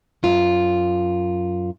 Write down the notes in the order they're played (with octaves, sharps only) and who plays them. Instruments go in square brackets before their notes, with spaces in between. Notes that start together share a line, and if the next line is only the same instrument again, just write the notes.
[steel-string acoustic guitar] F#2 F4